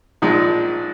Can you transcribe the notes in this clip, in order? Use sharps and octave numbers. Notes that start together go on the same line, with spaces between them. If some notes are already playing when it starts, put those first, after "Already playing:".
A#1 A#2 F3 G#3 D#4